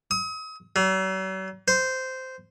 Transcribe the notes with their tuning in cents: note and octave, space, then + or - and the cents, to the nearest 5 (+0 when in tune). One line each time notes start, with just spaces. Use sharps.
D#6 +40
F#3 +45
C5 -10